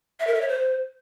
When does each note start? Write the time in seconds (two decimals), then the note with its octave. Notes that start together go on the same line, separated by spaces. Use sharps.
0.20 E5
0.27 A#4
0.34 E5
0.41 C#5
0.49 C5